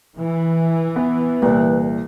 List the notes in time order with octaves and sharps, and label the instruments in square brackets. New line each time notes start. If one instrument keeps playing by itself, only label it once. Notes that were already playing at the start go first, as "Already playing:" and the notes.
[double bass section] E3
[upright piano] B3
[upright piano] C2 A#2 [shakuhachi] B4